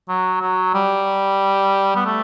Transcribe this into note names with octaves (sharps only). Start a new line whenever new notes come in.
F#3
F#3
G3
B3
A3